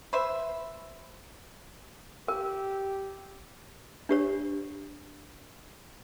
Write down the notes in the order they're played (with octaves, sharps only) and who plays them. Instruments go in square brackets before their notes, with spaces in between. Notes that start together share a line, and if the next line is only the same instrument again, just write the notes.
[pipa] B4 C5 E5
[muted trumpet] G4 [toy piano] A#4
[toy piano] D4 G4 C#5